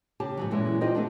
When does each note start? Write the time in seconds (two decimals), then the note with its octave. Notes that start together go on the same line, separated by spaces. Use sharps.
0.20 C#3 G4 A5
0.37 G#2 E3 F#3
0.51 A#2 E3 F#3 G#3 C#4 E4
0.81 D#4 F4 G4 C5 D5 D#5
0.95 A3 B3 D4